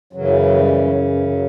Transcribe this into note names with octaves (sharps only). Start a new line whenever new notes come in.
F#2 C#3 E3 F#3
F#3
G3
F#3
E3
E3
F#3